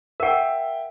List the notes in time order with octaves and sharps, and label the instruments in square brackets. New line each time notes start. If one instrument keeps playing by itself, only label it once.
[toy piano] A#4 F#5 [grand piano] E5 G5